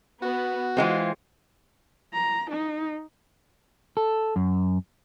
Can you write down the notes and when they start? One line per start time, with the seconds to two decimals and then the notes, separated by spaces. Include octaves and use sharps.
0.22 B3 F#4
0.77 E3 G#3 C4 F4
2.14 A#5
2.51 D#4
3.97 A4
4.36 F#2